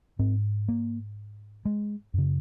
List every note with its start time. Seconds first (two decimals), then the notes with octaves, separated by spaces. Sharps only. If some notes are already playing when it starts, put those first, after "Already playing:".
0.19 G#2 C4
0.68 A#3
1.65 G#3
2.14 F#2 C#3